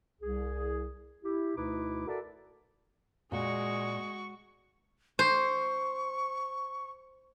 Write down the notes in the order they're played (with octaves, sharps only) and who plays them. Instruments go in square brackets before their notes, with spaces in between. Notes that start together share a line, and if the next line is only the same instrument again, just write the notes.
[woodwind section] C2 G#4
E4 G4
D2 B2 D#4 E4 B4 D6
F#4 A4 A#4 D5 E5
[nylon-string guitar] A#2 [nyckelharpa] G#3 [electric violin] F#4 C#6
[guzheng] C5 [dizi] C#6